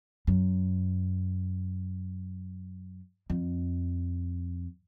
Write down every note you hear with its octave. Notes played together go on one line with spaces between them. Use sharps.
F#2
F2